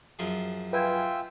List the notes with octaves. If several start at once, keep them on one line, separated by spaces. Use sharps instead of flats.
F#2 F3 G#4
F4 B4 E5 G5 G#5